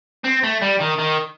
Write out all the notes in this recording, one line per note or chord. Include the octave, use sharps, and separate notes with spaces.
C4
A3
G3
D#3
D#3